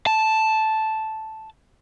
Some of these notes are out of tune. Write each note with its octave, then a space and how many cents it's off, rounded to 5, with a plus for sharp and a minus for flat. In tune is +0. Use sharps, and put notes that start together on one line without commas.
A5 -5